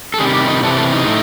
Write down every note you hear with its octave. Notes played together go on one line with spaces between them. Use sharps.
A4
C3 D#3 G3 G#4
G4
D#4
C3 E3 G3 A4
A4
D#4
A2 A3